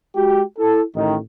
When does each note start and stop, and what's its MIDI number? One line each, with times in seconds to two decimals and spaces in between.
0.16 0.42 56
0.16 0.42 66
0.16 0.42 67
0.57 0.81 64
0.57 0.81 69
0.96 1.16 33
0.96 1.16 51